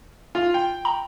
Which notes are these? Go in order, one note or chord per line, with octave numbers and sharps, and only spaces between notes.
F4
G5
A#5